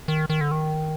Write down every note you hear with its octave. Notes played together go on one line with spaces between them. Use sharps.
D#3
D#3
D3
D#3